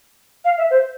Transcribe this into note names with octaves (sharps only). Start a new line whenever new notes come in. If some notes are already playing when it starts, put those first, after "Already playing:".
F5
E5
C5